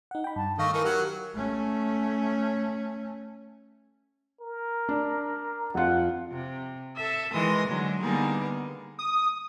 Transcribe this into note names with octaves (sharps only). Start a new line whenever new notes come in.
D#4 F#5
G5 B5
G2 A5
D#3 A3 D#5 F5 C#6 A#6
E3 D#4 A#4
F#3 G4 F#5
A3 C#4
A#4
D4
F2 F4 F#5
C3
A4 E5
D#3 E3 G#3 C6 D#6 A#6
D3 F#3 G#3
D3 G3 A#3 B3 D#4 G#4
D#6